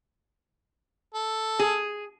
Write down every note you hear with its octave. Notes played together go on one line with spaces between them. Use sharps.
A4
G#4